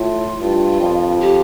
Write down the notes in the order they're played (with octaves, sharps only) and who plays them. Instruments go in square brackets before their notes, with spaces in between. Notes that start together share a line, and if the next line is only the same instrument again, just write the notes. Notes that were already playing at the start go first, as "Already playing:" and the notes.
Already playing: [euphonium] A2 [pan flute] F4
[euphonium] G2
F2
[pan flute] G4